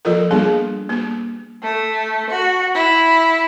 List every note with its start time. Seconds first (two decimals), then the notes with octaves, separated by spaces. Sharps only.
0.05 F3 A#3 F4 A4 A#4
0.31 G3 A#3 B3 D4 G#4
0.89 A#3
1.62 A3
2.30 F#4
2.74 E4